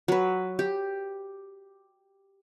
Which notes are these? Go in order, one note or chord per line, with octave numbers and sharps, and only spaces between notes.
F#3 B4
G4